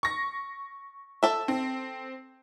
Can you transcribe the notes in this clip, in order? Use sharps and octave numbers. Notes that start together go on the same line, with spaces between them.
C#6 A#6
A4 E5
C4